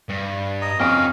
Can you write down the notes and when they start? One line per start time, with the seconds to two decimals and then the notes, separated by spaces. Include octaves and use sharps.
0.09 G2
0.62 D#5 A#5 D#6
0.80 F2 C#4 D#5 F5 G5 D#6 F6